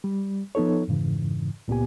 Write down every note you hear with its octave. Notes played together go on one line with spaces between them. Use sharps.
G3
F3 B3 D#4 A4 C#5
F2 G#2 C#3 E3
C#2 A#2 B3 G4 G#5